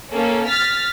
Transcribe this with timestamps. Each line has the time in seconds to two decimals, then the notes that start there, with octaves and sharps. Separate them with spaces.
0.11 A#3 C#4 A4
0.49 F6 A6 B6